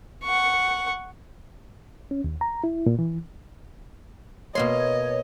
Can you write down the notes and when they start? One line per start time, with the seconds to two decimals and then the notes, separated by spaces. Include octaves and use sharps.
0.24 F#5 C#6
2.11 C#4
2.24 D#2
2.41 A#5
2.64 E4
2.86 A#2
2.99 E3
4.55 B2 A#3 C#5 D#5 C6